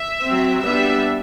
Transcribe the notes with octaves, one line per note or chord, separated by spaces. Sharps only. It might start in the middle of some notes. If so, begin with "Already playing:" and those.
Already playing: E5
F#3 C4
G3 B3 D4 E5